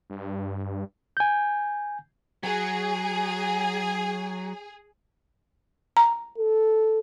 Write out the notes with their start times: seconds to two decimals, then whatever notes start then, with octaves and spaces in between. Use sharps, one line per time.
0.10 G2
1.17 G#5 G6
2.43 F#3 G#4
5.97 A#5
6.38 A4